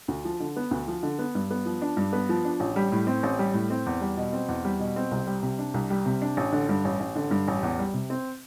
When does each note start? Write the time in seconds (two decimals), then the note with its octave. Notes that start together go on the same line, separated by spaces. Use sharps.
0.08 D2
0.25 F3
0.40 D3
0.56 B3
0.71 D2
0.88 F3
1.03 D3
1.19 B3
1.35 G2
1.51 B3
1.66 F3
1.81 D4
1.97 G2
2.13 B3
2.29 F3
2.45 D4
2.60 A1
2.76 G3
2.92 A2
3.07 C4
3.23 A1
3.39 G3
3.54 A2
3.70 C4
3.86 E2
4.01 G3
4.17 B2
4.33 C4
4.49 E2
4.65 G3
4.79 B2
4.96 C4
5.11 C2
5.27 G3
5.43 C3
5.58 D4
5.74 C2
5.90 G3
6.06 C3
6.22 D4
6.37 A1
6.52 D3
6.69 G2
6.85 A1
7.00 A1
7.16 D3
7.31 G2
7.48 A1
7.63 E2
7.79 G3
7.94 C3
8.10 C4